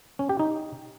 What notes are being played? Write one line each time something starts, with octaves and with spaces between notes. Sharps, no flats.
C#4
G4
D#4